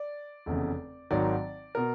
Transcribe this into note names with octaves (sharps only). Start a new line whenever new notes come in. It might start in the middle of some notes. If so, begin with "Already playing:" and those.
Already playing: D5
F1 E2 C#3
G#1 G#2 D#3 F#3 D5
B2 A#4